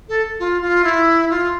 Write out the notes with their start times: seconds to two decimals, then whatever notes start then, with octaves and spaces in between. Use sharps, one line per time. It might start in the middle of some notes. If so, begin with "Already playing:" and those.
0.09 A4
0.39 F4
0.62 F4
0.84 E4
1.30 F4